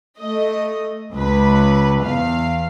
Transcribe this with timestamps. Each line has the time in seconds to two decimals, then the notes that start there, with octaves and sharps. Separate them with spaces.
0.19 A3 D#5
1.13 C#2 B4
2.01 E2 F5